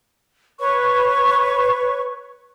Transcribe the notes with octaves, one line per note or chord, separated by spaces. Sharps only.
B4 C#5 C#6